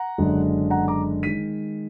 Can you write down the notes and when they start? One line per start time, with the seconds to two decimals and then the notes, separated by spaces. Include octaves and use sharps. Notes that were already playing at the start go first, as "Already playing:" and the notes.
Already playing: F#5 A#5
0.18 F#1 F#2 D3 G#3 D4
0.70 F#5 A#5
0.88 A#5 D6
1.23 D#3 G#3 B6 D#7